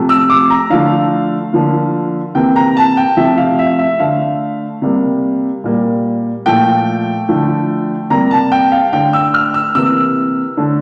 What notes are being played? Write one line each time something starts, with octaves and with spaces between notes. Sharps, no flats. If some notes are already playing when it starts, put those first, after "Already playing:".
Already playing: C3 F3 A3
E6
D6
A#5
D3 F3 A3 F5
D3 F3 A#3
C3 E3 A#3 G5
A#5
A5
G5
C3 F3 A3 E5
F5
E5
E5
D3 A3 F5
C3 G3 A#3
A#2 G3 A#3
A#2 F3 A3 G5
D3 F3 A3
C3 G3 A#3 A#5
A5
G5
F5
D3 A3 G5
E6
F6
E6
C3 E3 A#3 E6
D3 A3